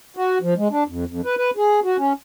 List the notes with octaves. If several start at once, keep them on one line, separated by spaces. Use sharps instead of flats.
F#4
F3
G#3
D4
F2
F2
B4
B4
G#4
F#4
C#4